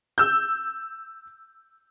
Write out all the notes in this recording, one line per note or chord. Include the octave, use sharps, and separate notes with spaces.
E6 G6